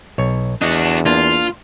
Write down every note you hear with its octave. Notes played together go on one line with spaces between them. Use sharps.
B1 C#5
E2 D4 F#4 D#5
A#3 D4 F4